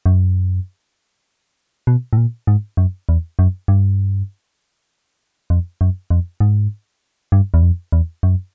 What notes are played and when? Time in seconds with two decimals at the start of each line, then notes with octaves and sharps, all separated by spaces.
0.06 F#2
1.87 B2
2.13 A2
2.17 A#2
2.47 G#2
2.77 F#2
3.09 E2
3.39 F#2
3.68 G2
5.50 F2
5.81 F#2
6.10 F2
6.40 G#2
7.32 G2
7.54 E2
7.62 F2
7.92 E2
8.23 F#2